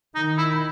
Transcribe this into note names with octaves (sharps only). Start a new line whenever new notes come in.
D#3 D#4
E4